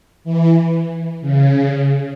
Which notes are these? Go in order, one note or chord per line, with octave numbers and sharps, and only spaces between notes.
E3
C#3